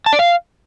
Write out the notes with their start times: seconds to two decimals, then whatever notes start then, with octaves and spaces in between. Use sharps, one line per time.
0.06 A5
0.13 D5
0.19 F5